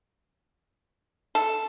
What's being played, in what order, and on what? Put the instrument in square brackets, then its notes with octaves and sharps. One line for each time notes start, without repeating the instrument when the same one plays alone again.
[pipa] A4